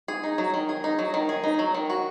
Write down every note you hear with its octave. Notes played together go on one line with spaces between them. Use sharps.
G#4
D#4
F#3
D#3
G#4
D#4
F#3
D#3
G#4
D#4
F#3
D#3
F#4